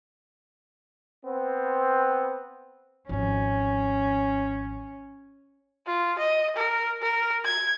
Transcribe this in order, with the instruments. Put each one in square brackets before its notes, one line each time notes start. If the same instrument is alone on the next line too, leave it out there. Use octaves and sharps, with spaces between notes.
[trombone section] B3 C4
[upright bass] G#1 F3 [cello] C#4
[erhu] F4
D#5
A#4
A#4
G#6